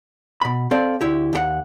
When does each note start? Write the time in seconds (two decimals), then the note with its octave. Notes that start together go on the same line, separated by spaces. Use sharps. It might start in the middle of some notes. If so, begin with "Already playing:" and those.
0.41 B2 B5
0.71 C4 A4 D5 F5
1.01 D2 E4 G4
1.33 D#2 G4 F#5